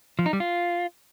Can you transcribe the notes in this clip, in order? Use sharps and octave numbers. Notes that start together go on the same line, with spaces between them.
F3
D#4
G3
F4